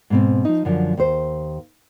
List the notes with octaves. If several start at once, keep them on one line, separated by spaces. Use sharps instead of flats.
G#2 B2 C4
F3 D#4
F#2 D3 F3
D#2 C5